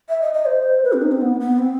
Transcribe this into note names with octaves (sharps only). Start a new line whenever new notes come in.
E5
D#5
D#5
C5
B4
C4
D#4
C4
B3
B3
C4